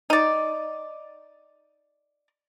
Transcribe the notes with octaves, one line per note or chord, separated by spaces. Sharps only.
D#4 D5